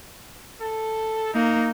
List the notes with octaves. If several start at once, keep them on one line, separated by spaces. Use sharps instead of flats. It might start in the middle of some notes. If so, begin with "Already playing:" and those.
A4
A#3 D#4